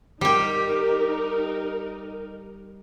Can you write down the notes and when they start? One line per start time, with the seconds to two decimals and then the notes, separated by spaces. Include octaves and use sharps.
0.21 G3 D#4 G4 A#4